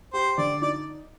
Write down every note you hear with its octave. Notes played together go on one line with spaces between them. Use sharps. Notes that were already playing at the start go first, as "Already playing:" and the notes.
G4 C5
D3 D5
D#4 D5